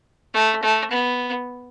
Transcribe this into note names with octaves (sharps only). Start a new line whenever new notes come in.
A3
A3
B3